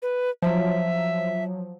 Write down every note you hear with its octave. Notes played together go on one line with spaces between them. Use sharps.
B4
F3 F#3 E5